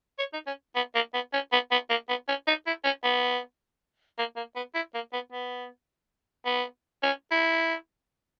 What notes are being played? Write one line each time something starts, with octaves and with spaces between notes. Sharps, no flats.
C#5
D#4
C#4
B3
A#3
B3
C#4
B3
B3
A#3
B3
C#4
D#4
E4
C#4
B3
A#3
A#3
B3
E4
A#3
B3
B3
B3
C#4
E4